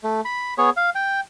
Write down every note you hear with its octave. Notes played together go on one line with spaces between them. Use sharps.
A3
B5
B3 G#4 C#5
F5
G5